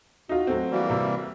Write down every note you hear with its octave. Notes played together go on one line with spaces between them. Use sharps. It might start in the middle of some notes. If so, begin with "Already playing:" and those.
D#4 F4 F#4
F#3 A3 C4
E3 G3 A#3
C3